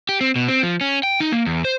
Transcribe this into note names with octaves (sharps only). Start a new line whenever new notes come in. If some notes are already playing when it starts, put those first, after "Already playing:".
G4
C4
B2
C4
F3
C#4
G5
D#4
A#3
E2
C5